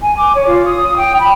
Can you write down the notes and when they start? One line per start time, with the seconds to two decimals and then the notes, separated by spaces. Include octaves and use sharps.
0.01 G#5
0.17 D6
0.34 C#5
0.45 F4
0.65 D#6
0.96 G5
1.18 B5